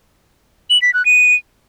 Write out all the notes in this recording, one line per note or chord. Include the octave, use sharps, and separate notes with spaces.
F#7
B6
F#6
D#7